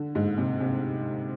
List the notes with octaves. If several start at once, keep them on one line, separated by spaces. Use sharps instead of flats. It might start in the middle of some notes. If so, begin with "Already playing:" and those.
Already playing: D3
G#2
C3
C3